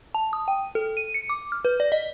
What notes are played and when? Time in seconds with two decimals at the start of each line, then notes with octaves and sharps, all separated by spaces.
0.15 A5
0.33 D#6
0.48 G5
0.75 A4
0.97 D#7
1.14 C#7
1.29 D6
1.52 F6
1.65 B4
1.80 D5
1.92 D#5